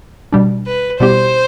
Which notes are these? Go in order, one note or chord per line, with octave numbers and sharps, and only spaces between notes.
B2 G3 D4
B4
B2 G3 B3 E4 G4 C5